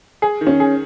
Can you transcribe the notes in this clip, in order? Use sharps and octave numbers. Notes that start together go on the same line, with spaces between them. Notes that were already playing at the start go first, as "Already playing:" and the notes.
G#4
D#3
C#4
G#4